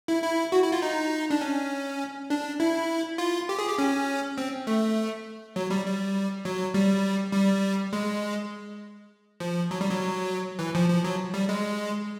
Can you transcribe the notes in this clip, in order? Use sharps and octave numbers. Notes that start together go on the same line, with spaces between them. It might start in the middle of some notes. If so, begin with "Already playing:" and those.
E4
E4
F#4
E4
F4
D#4
D4
C#4
D4
E4
F4
G4
G#4
G4
C#4
C4
A3
F#3
G3
G3
F#3
G3
G3
G#3
F3
F#3
G3
F#3
E3
F3
F3
F#3
G3
G#3